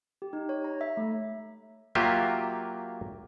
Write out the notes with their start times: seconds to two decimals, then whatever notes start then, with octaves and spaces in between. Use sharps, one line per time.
0.22 G4
0.33 D#4
0.49 C#5
0.64 A#5
0.81 E5
0.97 A3
1.95 F#3 A#3 F4 G4 E5